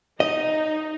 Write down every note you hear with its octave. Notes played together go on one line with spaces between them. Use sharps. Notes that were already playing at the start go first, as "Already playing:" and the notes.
D#4 D#5